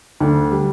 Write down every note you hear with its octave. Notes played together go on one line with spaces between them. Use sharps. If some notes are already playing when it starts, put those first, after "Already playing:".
D2 D4
G3